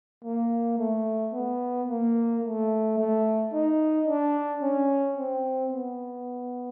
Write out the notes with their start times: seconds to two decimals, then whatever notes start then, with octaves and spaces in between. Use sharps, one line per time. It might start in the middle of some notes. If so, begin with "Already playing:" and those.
0.25 A#3
0.79 A3
1.33 B3
1.88 A#3
2.44 A3
2.98 A3
3.53 D#4
4.08 D4
4.62 C#4
5.17 C4
5.72 B3